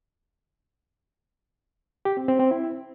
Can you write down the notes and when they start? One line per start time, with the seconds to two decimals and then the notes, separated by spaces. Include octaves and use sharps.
2.05 G4
2.17 C4
2.28 C4
2.40 C4
2.51 E4